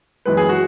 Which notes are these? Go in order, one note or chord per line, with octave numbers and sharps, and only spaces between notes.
F#2 E3 G#3 B3 B4
G#4
F#4